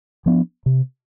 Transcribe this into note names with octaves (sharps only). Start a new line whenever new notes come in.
F3 B3 D4
C3